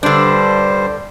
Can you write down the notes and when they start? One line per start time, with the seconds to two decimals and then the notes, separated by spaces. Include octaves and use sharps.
0.03 G2 D3 G3 D4 C5